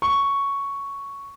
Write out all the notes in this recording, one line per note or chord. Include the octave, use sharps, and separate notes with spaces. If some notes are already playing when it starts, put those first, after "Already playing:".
C#6